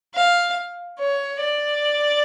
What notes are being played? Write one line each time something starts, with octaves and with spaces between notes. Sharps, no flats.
F5
C#5
D5